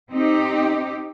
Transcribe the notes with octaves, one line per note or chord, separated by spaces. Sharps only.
C4 D#4 G4